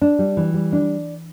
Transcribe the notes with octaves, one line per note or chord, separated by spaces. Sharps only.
D4
G3
E3
G3
D4